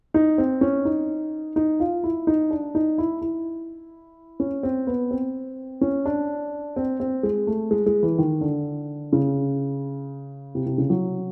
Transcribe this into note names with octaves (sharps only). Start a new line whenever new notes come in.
D#4
C4
C#4
D#4
D#4
F4
E4
D#4
D4
D#4
E4
E4
C#4
C4
B3
C4
C#4
D4
C4
C4
G#3
A3
G#3
G#3
E3
D#3
D3
C#3
C3
C3
C#3
F#3